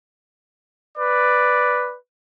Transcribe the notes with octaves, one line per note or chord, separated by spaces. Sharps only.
B4 D5